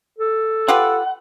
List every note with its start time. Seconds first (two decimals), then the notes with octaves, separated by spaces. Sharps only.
0.19 A4
0.68 F4 G4 B4 F#5